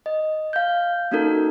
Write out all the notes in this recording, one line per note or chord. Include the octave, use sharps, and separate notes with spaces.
D#5
F5 G6
A#3 C#4 D#4 F#4 A4 A#4